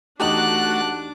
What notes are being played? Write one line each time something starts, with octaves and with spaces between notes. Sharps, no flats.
E2 A3 D4 D#4 F#4 G4 D6 F#6